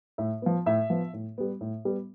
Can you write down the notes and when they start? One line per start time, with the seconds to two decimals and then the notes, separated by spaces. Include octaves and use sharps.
0.18 A2 E5
0.42 F3 B3
0.66 A2 E5
0.90 F3 B3
1.13 A2
1.38 G3 B3
1.61 A2
1.85 G3 B3